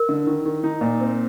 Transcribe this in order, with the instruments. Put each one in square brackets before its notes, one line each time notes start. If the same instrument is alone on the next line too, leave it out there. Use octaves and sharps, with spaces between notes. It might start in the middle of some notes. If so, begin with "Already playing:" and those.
Already playing: [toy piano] A#4
[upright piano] D3
D#3
D#3
D#4
A#2
C4